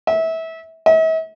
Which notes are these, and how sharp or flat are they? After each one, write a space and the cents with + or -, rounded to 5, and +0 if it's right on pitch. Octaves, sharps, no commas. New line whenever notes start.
E5 -25
E5 -45